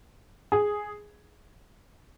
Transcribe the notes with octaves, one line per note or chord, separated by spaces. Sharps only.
G#4